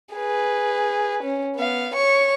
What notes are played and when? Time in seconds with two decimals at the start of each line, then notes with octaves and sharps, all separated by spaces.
0.15 G#4 B4
1.23 C#4
1.55 B3 F5
1.94 C#5 C#6